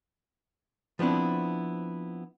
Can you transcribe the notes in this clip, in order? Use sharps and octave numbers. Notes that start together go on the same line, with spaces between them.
F3 B3 C4 D4 E4